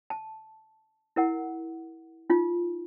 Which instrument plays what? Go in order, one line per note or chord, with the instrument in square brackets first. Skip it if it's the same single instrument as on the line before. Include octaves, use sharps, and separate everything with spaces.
[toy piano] A5
E4 A#4 F#5
D#4 F4